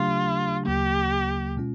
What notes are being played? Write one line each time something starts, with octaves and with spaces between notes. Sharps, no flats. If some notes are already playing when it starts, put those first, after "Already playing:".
Already playing: C#3 F#3 A3 D4 F4 G4
D2 C#3 F#3 A#3 G4
B2 G#3 C#4 F4